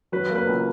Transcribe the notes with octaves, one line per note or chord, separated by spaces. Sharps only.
F#3 B4
A#3
B4
C#2